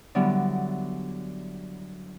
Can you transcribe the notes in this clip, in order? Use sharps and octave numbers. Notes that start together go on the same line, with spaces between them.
D3 F#3 G3 B3 E4